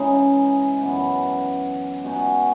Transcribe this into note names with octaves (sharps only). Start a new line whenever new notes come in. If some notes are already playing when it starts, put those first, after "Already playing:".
Already playing: C#3 E3 G#3 D#4
F#2 E3 B3
B2 G#3 D#4 F#4